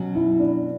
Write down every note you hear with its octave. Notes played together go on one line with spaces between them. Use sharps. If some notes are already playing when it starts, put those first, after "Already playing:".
Already playing: B2 F#3 C#4
E4
D4